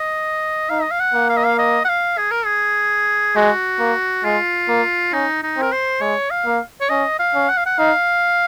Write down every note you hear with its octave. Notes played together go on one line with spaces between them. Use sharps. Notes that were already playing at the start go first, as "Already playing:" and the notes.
Already playing: D#5
D#4 F5
D#5
F5
F#5
A#3
F5
D#5
F5
D#5
F#5
F5
G#4
A#4
G#4
G#3 F#4
A#3
G#3 F4
A#3
C#4 D#4
D#4
C4 A#4
C5
G#3 C#5
F5
A#3
C#5
C#4 D#5
F5
C#4
F#5
F5
F#5
D#4 F5